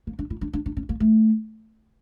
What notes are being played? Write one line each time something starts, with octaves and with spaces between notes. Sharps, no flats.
A#3
D4
E4
D4
D4
D4
C#4
A#3
A3